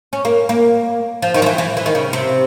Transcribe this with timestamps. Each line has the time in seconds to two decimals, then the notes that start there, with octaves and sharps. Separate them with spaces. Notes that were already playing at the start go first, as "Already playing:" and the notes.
0.13 C#4
0.25 A#3
0.49 A#3
1.22 F3
1.34 D#3
1.42 F3
1.46 E3
1.58 E3
1.77 E3
1.86 D#3
1.95 C#3
2.13 C3